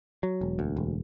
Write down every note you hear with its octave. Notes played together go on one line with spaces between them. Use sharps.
F#3
E1
D2
E1